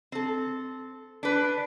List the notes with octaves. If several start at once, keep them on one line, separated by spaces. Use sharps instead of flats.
C4 A4
D4 B4